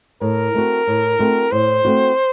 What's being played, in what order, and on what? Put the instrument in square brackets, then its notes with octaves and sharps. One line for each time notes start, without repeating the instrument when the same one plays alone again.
[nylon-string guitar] A2 [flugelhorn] A#4
[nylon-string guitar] A3 C4 F#4
A2
A3 C4 F#4
[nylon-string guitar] A2 [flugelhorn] C5
[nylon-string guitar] A3 C4 F#4